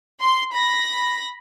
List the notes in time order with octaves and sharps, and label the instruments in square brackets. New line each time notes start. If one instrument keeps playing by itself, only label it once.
[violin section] C6
B5 A#6